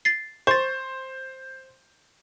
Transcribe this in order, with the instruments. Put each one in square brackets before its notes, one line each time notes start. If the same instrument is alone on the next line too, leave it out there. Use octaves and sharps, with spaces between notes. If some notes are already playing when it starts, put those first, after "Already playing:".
[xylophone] A6 C7
[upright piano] C5 [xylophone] C#6 A6